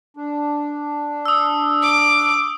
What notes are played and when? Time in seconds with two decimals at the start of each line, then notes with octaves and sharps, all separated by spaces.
0.17 D4
1.26 D#6 E6
1.82 D6